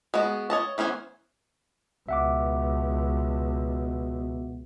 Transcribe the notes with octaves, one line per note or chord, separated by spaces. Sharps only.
G#3 B3 F#4
C#5 D#5 A5
E3 B3 C#4 C5 G#5
C#2 B2 E5 F#5 D6